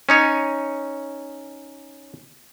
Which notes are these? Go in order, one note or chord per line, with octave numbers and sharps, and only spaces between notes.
C#4 D#4 C#5